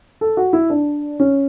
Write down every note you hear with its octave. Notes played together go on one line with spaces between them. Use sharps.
A4
F#4
E4
D4
C#4